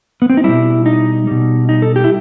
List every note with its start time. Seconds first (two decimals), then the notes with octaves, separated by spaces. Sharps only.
0.22 B3
0.30 C4
0.37 D#4
0.44 B2 G3 E4
0.86 D#4
1.27 B2 G3
1.69 D#4
1.82 A4
1.96 G4
2.04 E4